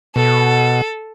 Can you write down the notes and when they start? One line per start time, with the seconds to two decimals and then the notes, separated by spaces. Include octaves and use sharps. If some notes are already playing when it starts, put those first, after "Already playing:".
0.16 B2 A4